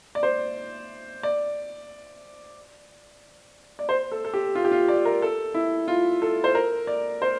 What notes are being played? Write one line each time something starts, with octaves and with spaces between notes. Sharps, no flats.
D5
C5
D5
D5
C5
A4
A4
G4
F4
G4
F4
D5
A#4
A4
E4
F4
A4
C5
A#4
D5
C5